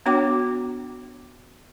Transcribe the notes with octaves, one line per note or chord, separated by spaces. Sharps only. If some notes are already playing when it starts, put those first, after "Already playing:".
B3 D4 F#4 C#5 G5 D6